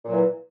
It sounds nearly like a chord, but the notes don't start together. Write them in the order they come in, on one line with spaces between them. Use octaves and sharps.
A#2 F#3 E3